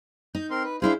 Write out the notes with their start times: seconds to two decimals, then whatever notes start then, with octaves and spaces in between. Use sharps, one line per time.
0.35 D#4 G6
0.50 C4 A#4 C6
0.63 B4
0.82 D4 E4 G#4 C5 F5